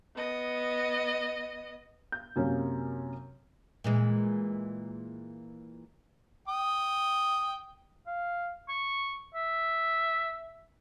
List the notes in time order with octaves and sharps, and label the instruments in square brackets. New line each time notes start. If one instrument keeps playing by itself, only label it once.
[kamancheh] B3 D#5
[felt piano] G6
F#2 C3 F#3 A#3 C#4
[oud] A#2 E3 G#3
[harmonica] G5 D#6
[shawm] F5
C#6
E5